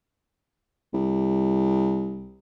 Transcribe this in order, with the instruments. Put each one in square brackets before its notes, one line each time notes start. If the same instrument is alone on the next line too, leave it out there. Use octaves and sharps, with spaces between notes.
[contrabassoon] C2